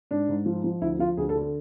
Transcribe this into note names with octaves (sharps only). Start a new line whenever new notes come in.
G#2 D4
G#2
F3
F3
D2 E4
F3 F4
D2 G#4
A4
D3
A4